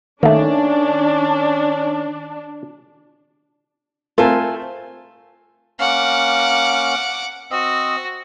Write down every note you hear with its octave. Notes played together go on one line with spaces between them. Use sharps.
D#3 A3 A#3 C#4 D4
A3 C4 F4 A4 A#4 G#5
A#3 C#4 F#5 D6 F6
C4 F#4 D#5 E6